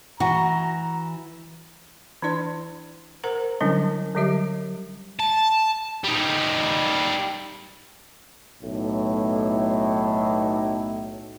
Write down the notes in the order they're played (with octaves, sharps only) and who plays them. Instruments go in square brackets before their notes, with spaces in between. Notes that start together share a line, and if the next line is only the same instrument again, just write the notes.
[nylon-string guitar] E3 [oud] F#4 [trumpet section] A#5
[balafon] E3 D4 E4 D5 C6
A#4 C5 F#5 A#5
D3 F#3 G3 C#4 D4 E4
D3 F#3 G3 G4 E5
[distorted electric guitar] A5
G3 D#4
[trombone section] B1 A2